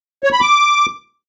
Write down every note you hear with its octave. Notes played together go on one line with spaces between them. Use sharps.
C#5
B5
D6